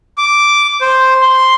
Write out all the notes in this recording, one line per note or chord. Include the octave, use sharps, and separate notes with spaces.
D6
C5
C6